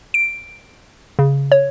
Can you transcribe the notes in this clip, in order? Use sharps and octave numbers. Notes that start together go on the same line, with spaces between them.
D7
C#3
C#5